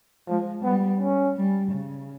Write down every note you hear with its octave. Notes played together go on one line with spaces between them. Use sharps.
F3 G#3
G3 B3
C#4
G3
C#3